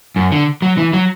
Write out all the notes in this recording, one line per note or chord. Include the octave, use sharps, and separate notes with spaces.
F#2
D3
F#3
E3
F#3